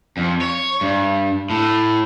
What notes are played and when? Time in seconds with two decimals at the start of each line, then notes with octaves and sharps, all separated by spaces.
0.17 F2
0.41 C#5
0.81 G2
1.50 A2